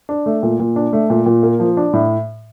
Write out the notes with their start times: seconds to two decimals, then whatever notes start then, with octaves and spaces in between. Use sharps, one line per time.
0.09 D4
0.26 A3
0.43 A#2
0.60 A#2
0.76 D4
0.93 A3
1.10 A#2
1.26 A#2
1.43 A#3
1.60 F3
1.77 D4
1.93 A2